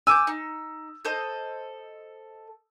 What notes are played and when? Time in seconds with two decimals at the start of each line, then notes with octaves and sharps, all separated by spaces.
0.07 G#5 D6 E6 G6
0.27 D#4
1.05 A4 C5 D#5